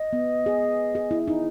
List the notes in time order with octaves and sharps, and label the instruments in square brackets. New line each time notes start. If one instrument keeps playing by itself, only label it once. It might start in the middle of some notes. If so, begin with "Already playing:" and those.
Already playing: [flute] D#5
[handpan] B3
G#4
G#4
E4
D#4